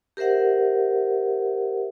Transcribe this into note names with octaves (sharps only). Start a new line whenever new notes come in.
G4 A#4 C5 E5 F#5